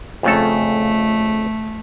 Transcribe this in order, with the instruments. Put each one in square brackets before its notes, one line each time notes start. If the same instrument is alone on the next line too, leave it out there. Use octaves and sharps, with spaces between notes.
[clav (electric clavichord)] F2 C#3 A4 [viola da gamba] A3